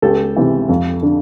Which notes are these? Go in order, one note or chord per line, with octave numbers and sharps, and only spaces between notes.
C#2 G4 A4
C3 E3
F2
D3